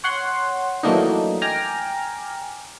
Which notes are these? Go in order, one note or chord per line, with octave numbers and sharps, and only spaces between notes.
C#5 F#5 C6
E3 F#3 A3 A#3 D4 D#4
G5 G#5 A#5 D6 F6